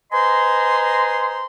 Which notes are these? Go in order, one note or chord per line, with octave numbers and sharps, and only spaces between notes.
B4 C5 D#5 G#5 A#5 C6